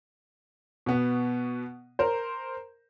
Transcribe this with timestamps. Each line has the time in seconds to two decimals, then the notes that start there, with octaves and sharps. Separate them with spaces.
0.86 B2 B3
1.99 A#4 C5